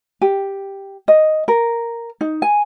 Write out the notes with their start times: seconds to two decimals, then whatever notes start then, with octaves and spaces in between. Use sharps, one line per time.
0.21 G4
1.08 D#5
1.48 A#4
2.21 D#4
2.42 G#5